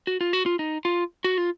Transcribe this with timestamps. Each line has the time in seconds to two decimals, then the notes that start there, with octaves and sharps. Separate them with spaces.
0.07 F#4
0.21 F4
0.33 F#4
0.46 F4
0.59 D#4
0.85 F4
1.24 F#4
1.38 F4